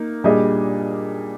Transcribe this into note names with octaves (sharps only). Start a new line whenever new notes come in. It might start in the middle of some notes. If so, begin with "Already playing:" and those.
Already playing: A#3 D#4
A#2 G3 D4 G#4 D#5